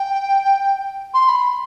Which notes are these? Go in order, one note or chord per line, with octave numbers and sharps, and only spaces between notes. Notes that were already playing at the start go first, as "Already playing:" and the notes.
Already playing: G5
C6
B5